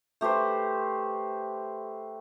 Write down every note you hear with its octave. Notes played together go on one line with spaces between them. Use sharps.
A3 G4 B4 C5